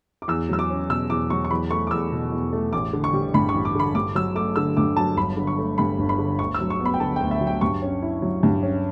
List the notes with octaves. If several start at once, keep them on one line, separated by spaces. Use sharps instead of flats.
D6
E2 E6
F#3 E6
D6
C#4
B2 E6
E2 D6
F#3 C#6
C#6
E2 B5
A3 C#6
D6
E2 E6
B2
E2
A3
A1 D6
D3
C#6
G3
G2 B5
C#6
A1
D6
D3 B5
G2 D6
F#3 E6
A3 D6
D3 E6
G2 D6
F#3 A5
G1 B5
D3
C#6
A3
G2 B5
G1
B5
D3
D2 C#6
E6
F#3
C#6
B3
B5
G5
D3 A5
D2 G5
E5
F#3
G5
G2 C#6
C#4
E4
F#3
G2
C#4